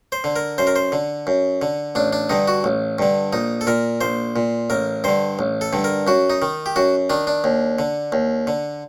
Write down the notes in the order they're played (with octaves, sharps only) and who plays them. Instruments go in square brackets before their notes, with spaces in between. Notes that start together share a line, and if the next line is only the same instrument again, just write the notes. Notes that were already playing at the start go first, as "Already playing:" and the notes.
[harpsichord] C5
D3
A#4
F#2 C5
A#4
C5
D3
F#2
D3
A1 D4
D4
G2 D3 D#4
F#4
A1
G2 D3
A#1 D#4
A4
A#2 A#4
A#1 C5
A#2
A1 A#4
G2 D3 C5
A1
A4
G2 D3
A#4
F#2 F#4
D#4
D#3
G4
F#2 F#4
D#3 D4
D4
D#2
D3
D#2
D3